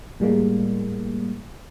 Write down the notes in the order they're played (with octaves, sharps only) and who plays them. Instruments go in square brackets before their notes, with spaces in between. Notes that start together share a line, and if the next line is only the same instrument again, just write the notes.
[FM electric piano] A2 G3 G#3 A#3